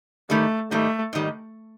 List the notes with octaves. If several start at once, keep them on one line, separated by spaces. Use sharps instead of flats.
G#2 D#3 G3 A3
G#2 D#3 G3 A3
G#2 D#3 G3